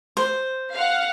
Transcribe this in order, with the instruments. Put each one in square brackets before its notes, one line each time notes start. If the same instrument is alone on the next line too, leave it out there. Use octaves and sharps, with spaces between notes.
[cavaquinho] C5
[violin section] F5 F#5